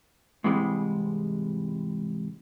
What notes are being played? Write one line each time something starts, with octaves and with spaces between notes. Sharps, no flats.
G#2 C3 E3 G3 G#3